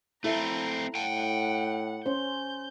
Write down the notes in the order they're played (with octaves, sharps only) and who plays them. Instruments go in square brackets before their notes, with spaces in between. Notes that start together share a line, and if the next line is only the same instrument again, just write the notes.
[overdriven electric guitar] A3 C4 [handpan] E4 A4 E5 [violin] A#5
[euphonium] A2 [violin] F#5 [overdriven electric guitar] G5 A5
[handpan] C#4 C5 [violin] G6